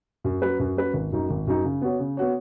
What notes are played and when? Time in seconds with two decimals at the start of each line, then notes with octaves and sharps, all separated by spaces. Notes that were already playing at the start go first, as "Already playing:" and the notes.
0.24 F#2
0.42 F#3 C#4 B4
0.59 F#2
0.77 F#3 C#4 B4
0.94 G#1
1.12 F#2 F#3 D#4
1.30 G#1
1.47 F#2 F#3 D#4
1.64 C#3
1.82 B3 F#4 C#5
1.99 C#3
2.17 B3 F#4 C#5